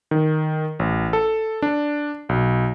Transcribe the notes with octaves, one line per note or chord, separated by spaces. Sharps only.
D#3
A1
A4
D4
B1